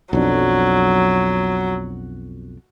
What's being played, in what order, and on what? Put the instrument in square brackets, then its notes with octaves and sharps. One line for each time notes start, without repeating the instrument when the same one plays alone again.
[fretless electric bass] B1 F2 D4 [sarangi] F#3